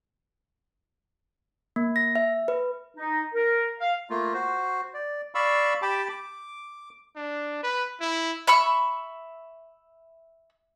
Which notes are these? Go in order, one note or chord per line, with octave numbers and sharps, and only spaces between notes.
A#3
A#6
E5
B4
D#4
A#4
F5
A3 A#3 F4
F#4 C5
D5
D5 F5 B5 C#6 E6
G4 G5 A5 B5 D6
D6
D4
B4
E4
E5 B5 C#6 E6